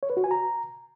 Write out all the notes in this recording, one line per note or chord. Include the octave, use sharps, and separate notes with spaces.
C#5
B4
F#4
G#5
A#5